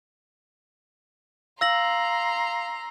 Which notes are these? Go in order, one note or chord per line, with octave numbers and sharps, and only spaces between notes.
F5 A#5 C6 E6 A#6 F#7